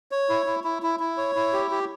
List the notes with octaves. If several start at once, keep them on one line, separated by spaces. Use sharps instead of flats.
C#5
E4
E4
E4
E4
E4
C#5
E4
G4
G4